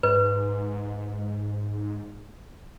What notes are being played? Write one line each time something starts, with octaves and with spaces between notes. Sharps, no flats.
G#2 B4